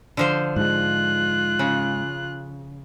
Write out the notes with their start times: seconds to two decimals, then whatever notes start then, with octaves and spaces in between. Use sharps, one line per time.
0.17 D3 F3 C5
0.56 G#2 G#3 F4 F#6
1.59 C#3